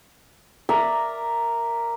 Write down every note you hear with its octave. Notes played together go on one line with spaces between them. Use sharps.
A#4 D5 E5 A#5